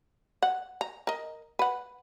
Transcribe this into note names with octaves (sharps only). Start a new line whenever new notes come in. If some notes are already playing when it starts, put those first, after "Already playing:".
F#5
A#5
A#4 D#5
B4 F#5